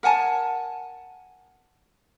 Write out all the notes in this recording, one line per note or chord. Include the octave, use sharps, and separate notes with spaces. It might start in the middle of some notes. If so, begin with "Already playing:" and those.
A#4 F#5 G#5 A5